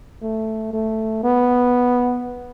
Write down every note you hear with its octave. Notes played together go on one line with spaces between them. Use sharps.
A3
A3
B3